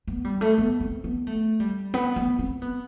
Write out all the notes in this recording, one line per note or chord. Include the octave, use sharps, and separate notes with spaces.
B3
G3
A3
B3
C4
B3
A3
G3
B3
B3
C4
B3